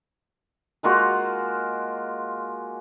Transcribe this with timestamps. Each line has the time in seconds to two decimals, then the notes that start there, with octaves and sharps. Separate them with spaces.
0.83 G#3 A#3 F4 F#4